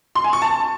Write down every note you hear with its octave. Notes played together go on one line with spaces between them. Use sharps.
C6
G#5
C#6
A5